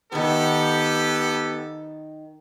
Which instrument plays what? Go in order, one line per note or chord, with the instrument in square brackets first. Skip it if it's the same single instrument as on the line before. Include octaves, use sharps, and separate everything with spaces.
[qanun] D#3 E5 G#5 [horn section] B3 G4 A4